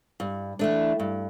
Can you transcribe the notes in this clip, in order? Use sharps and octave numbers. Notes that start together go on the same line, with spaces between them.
G2
E3 A3 D4
G2